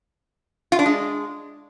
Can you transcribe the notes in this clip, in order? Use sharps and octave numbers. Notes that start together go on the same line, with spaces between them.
F4
D4
G#3